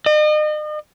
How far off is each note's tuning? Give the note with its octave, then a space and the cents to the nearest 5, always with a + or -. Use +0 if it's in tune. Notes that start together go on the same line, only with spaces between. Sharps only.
D#5 -40